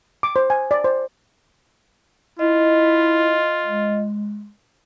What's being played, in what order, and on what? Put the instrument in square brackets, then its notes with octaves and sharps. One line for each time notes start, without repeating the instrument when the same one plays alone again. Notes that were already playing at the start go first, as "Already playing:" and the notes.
[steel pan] D6
C5
G#5
D5
C5
[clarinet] E4 [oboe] F4 [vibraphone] D#5
[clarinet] G#3